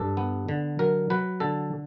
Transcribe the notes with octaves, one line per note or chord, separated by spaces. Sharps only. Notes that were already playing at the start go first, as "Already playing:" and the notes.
Already playing: G2 A4
B3
D3
F#3 A#4
F#3 B4
D3 A4